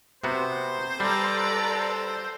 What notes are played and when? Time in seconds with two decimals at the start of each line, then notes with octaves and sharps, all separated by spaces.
0.24 C3 B3 F#4 C5
1.00 G3 A4 B4 D5 A#5
1.68 C5